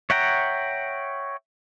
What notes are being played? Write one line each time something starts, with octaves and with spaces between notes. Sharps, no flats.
C#5 E5 F#5 G5 A#5